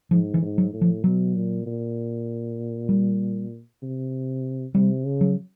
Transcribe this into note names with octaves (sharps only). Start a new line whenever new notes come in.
G#2 F3
E3
G#2
F#3
A2
F3
B2 F#3
A#2
A#2
G3
C3
C3 G3
C#3
F#3